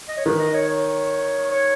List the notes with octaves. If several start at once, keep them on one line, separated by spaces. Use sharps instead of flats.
D#5
C#5
D#3 B4
D#5
C#5
C#5
C#5